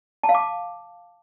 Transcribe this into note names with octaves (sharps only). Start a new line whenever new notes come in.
A5
F5
D6